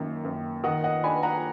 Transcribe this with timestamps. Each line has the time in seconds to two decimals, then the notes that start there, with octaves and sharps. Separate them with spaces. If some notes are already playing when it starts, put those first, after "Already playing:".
Already playing: F#2 D#3 A#3
0.25 F#2
0.64 D#3 D#5 F#5
0.84 D#5 F#5
1.04 D4 G#5 B5
1.23 F#5 A#5